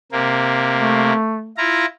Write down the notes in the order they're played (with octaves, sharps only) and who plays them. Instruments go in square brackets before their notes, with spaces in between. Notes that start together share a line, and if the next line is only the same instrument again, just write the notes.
[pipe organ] C3 A#3
[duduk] A3
[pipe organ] E4 F4 A#5